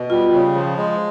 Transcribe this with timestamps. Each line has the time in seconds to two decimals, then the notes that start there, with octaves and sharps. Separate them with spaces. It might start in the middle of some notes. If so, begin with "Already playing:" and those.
Already playing: B2
0.10 G3 F4
0.33 C#3
0.55 F3
0.78 G#3